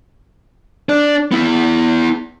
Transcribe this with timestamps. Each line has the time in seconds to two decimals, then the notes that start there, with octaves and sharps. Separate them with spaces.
0.89 D4 D5
1.32 B3 E4